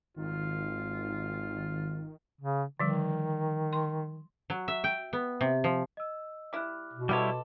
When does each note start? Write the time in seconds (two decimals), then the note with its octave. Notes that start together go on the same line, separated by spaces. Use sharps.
0.17 G#1 D#3 F4
2.41 C#3
2.79 D3 D#3 F3 G3
3.73 C6
4.50 F#3
4.68 E5
4.84 G5
5.13 B3
5.41 C3
5.64 F3
5.97 D#5 E6
6.53 G3 E4 D6 F6 F#6
6.93 B2
7.09 G3 B3 E4 F4 A4 C#5 D#5 D6